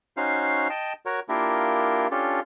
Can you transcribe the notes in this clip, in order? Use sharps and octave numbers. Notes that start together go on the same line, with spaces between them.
C#4 D#4 F#4 C5 F5
D#5 G5 A5
F#4 A#4 C#5
A#3 D4 E4 F4 G4 A#4
C#4 D4 F4 G4 A4